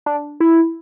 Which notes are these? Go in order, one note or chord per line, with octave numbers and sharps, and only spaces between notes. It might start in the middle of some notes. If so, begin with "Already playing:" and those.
D4
E4